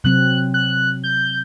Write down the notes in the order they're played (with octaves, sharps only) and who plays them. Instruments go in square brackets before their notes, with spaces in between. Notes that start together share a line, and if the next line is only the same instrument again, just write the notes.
[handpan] C3 F#3 C4 [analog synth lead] F#6
[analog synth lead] F#6
G6